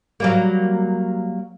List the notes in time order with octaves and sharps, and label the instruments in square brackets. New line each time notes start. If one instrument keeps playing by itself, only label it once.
[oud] F#3 G3 A#3